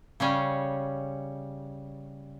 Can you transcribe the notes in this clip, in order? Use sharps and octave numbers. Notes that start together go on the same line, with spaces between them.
C#3 G3 C#4